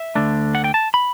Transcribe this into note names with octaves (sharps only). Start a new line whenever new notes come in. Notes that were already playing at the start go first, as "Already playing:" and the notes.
Already playing: E5
D2 D3 A3 D4
F#5
G5
A5
B5